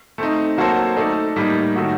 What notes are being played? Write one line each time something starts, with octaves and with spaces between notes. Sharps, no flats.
A3 C4 D#4
F#3 A#3 F#4 A4 C5
A3 D#4 A4 D5
A2 G3 A#3 D#4
D#3 F#3 A3 D#4 F#4